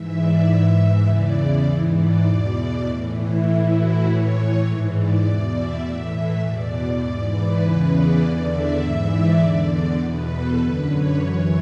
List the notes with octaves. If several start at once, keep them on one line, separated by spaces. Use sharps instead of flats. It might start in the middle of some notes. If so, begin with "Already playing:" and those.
Already playing: G#2 E3 E5
D5
G#2 E3 E5
E2 C#3 E3 D5
G#2 E3
D5
E2 B2 D5
A2 E3
E4
A2 E3
F#4
A2 E3 C#5
G#2 E3
D5
E2 B2
E5
A2 E3 E5
E5
E2 B2 D5
G#2 E3 D5
B4
E2 C#3 E3 B4
D5
E2 D3
E5
G#2 E3
D5
E2 D3 D5
E2 B2 B4
A4
F#2 D3 B4
C#5
F#2 E3 C#5